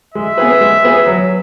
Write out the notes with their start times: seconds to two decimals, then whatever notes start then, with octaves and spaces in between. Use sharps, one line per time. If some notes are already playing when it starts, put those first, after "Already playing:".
0.14 G#3 E5
0.38 B3 G#4 B4
0.61 G#3
0.84 B3 G#4 B4
1.07 F#3